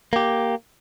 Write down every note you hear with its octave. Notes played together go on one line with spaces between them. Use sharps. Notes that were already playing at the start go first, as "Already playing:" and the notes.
A#3 G4